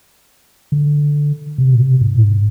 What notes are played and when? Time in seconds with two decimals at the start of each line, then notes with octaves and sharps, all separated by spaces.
0.72 D3
1.58 C3
1.74 A#2
1.80 C3
2.01 G#2
2.16 A#2
2.23 G#2